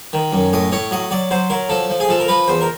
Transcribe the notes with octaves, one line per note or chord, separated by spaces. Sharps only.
D#3
F#2
A2 D#5
A2 C#5
F#3 D#5
F#3 D5
F#3 C5
F#3 A#4
F3 A4
F3
G#4
F3 A4
A#4
F3 B4
E2 C5
A#4